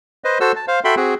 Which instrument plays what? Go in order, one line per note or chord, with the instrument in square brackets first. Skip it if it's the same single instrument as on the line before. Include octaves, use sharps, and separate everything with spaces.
[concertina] B4 C5 D#5
F#4 A4 C5 E6
A5
C5 F5
F#4 A4 E5 G5 B5 C6
C4 F#4 G#4